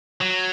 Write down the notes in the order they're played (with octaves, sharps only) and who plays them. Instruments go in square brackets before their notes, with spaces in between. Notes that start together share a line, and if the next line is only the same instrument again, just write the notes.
[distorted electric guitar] F#3